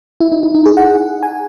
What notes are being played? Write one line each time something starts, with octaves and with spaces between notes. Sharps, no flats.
E4
D#4
E4
D#4
G#4
F#5
G#5